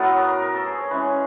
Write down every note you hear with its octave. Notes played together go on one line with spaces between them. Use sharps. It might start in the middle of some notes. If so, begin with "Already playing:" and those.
Already playing: A2 F#3 B3
A#4
A#4
A4
G#4
C#5
E3 G#3 C#4 B4